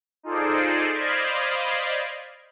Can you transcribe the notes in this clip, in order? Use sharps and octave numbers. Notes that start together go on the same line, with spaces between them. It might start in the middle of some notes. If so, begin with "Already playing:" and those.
D#4 F4 G#4 A4 C5 D5
C5 D5 D#5 F5 B5 G#6